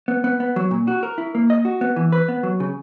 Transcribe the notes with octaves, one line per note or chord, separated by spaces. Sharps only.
B3
B3
B3
F#3
A#2
F#4
A#4
E4
A#3
D#5
F#4
B3
E3
B4
B3
F#3
C#3